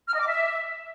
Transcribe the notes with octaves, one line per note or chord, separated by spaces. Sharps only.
F6
D#5
D6
E5